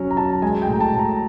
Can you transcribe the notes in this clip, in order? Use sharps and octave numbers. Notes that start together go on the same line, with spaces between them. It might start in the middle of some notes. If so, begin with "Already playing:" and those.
Already playing: F#3 C#4
A#5
F#3 A5
G#3 G#5
G5
A2
A#5
A5
A2
A#5